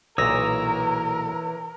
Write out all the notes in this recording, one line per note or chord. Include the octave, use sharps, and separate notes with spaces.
B1 A#2 E3 A#4 C#5 D#6 E6 A#6